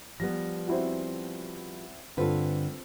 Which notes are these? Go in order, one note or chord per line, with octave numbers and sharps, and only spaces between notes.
F3 G3 B3 A#6
C4 E4 F#4
G2 D3 C4 F4 A4 B4